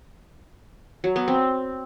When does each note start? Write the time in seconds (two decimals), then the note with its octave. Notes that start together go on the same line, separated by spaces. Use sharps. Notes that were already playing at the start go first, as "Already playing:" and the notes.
1.04 F#3
1.16 B3
1.28 C4